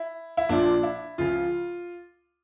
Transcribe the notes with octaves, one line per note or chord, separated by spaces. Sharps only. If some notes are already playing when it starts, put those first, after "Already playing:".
Already playing: E4
E4
A#1 A#2 F3 D4
E4
C#2 C#3 F3 F4